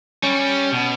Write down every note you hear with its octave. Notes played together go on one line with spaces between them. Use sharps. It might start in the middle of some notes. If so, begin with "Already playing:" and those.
G3 C#4
B2